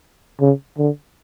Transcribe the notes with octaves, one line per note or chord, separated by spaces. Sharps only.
C#3
D3